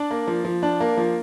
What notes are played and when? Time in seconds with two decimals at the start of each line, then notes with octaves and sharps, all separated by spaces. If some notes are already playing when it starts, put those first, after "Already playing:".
Already playing: D4 D5
0.11 A#3
0.27 F3
0.45 F3
0.63 D4
0.80 A#3
0.97 F3